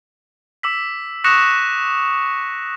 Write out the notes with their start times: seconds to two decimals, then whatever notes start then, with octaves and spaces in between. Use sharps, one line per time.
0.63 D6 E6 B6
1.24 C#6 D#6 F#6 A#6 C#7 E7